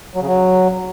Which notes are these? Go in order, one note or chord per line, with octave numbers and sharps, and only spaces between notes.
F#3
C#3
F#3